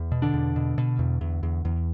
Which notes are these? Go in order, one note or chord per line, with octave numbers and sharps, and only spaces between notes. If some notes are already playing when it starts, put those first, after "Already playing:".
Already playing: E2
B2
D3 D4
E2
B2
B2
E2
E2
E2
E2